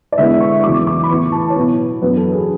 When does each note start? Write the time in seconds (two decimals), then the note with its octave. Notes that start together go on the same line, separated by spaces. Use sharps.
0.12 D5
0.18 D3 G#3 B3 E4 E5
0.40 C#6
0.64 E2 C#3 F#3 D6
0.87 D6
1.03 B5
1.10 A2 E3 B3 E4 C#6
1.32 A5
1.50 C#5
1.56 B2 F#3 B3 E4 B4
2.02 F#2 E3 B3 D4 B4
2.17 A4
2.32 G#4